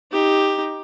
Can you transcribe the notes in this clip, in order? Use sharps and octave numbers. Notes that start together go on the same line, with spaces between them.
D#4 G4